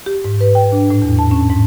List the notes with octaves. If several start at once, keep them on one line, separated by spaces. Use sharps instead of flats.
G4
G#2
B4
G5
D4
A2
E2
A5
C#4
G#2